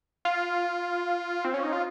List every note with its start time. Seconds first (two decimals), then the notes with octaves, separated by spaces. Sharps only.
0.25 F4
1.44 C4
1.54 C#4
1.63 D#4
1.73 F4